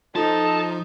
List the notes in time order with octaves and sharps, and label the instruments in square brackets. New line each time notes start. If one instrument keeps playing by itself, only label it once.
[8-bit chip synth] F3 [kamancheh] D#4 [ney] A4 [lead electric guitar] A5